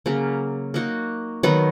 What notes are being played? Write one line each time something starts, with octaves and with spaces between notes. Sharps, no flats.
C#3 F#3 A#3
A#3 D#4 F#4
D#3 F#3 B3